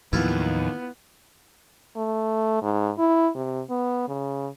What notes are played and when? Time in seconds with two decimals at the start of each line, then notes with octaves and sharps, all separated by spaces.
0.13 D#2 A2 F3 F#3 B3 E4 F4
1.96 A3
2.62 G#2
2.99 E4
3.35 C3
3.70 B3
4.08 C#3